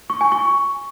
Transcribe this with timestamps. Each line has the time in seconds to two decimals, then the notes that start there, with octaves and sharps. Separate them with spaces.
0.10 C#6
0.21 G#5
0.32 C#6